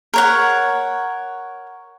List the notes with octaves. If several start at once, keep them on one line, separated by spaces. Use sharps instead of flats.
A#4 C#5 F#5